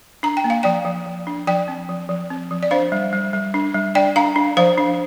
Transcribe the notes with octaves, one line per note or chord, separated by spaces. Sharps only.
D4 A#5
G5
A#3
F5
F3 D5 G5
F3
F3
D4
F3 D5 G5
C4
F3
F3
C4
F3
D5
D4 C5 F5
G3
G3
G3
D4
G3
D4 D5 G5
D4 F5 A#5
D4
F3 C5 F5
D4